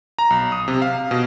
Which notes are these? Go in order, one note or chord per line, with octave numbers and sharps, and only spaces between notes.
A#5
B1
D#6
C3
F5
B2